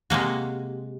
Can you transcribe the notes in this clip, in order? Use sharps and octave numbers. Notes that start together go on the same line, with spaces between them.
C3 G#3 A#3 F#4